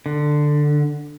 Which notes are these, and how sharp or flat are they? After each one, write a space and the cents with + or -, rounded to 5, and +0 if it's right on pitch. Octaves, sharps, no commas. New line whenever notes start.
D3 +10